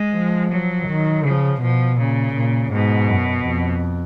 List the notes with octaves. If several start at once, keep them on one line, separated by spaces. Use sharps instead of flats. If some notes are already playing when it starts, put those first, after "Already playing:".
Already playing: G#3
F3
F#3
D#3
C#3 F3
B2 F3
A#2 C#3
A#2
G#2 B2
F#2
F2